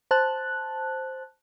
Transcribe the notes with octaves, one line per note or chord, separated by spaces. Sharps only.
C5 A5 F#6